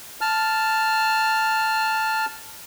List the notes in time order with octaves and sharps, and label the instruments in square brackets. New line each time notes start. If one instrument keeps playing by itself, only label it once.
[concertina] A5 F6